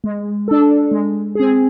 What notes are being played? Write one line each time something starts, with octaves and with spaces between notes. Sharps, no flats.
G#3
D4 A4
G#3
C4 G#4